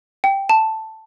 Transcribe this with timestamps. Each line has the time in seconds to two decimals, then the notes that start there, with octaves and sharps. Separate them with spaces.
0.24 G5
0.49 A5